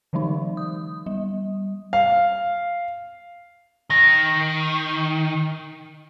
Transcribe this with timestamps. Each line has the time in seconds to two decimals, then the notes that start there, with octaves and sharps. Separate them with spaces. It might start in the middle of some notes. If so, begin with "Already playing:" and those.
0.13 D3 E3 F#3 G#3 D#4
0.57 D#6
1.06 G3
1.93 F5
3.90 D#3 A#6